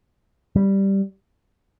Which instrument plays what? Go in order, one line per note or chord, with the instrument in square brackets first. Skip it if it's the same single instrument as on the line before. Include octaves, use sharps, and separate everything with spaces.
[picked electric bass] G3